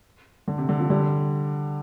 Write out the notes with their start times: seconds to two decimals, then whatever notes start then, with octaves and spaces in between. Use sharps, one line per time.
0.48 D3
0.58 C3
0.69 D3
0.79 C3 F3
0.90 D3 G3